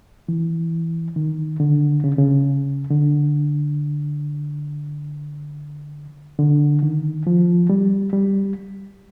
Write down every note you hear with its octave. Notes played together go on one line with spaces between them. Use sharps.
E3
D#3
D3
C#3
C#3
D3
D3
D#3
F3
G3
G3